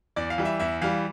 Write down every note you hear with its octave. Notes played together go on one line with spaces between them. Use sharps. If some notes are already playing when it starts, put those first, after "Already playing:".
E2 D5
F5
E3 G3
E5
E2 E5
E3 G3 F5